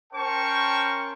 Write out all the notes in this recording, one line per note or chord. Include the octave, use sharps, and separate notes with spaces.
C#4 A#4 C5 G5 A5 C#6